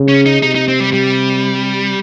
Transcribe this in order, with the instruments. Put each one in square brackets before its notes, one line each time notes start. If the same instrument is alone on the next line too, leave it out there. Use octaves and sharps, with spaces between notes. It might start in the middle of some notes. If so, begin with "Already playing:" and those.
Already playing: [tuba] C#3
[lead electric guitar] C#4
D#4
[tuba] C3 [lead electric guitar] D#4
[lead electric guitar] D#4
C4
G3
G3